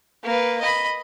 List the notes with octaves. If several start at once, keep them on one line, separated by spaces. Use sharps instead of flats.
A#3 B4
D#5 B5